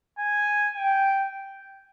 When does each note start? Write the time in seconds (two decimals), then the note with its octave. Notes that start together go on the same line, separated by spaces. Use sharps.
0.19 G#5
0.76 G5